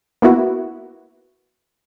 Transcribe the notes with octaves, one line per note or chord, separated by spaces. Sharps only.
A#3 B3 E4 F#4